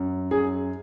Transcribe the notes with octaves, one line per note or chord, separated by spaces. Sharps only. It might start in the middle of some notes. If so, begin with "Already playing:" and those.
Already playing: F#2
F#2 G#4